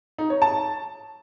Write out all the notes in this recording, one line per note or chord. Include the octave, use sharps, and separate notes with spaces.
D#4
C#5
A5